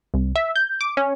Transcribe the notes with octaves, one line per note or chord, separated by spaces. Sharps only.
C2
E5
G6
D6
C#4